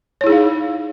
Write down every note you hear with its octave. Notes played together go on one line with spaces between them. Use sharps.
D#4 E4 G#4 C#5 F5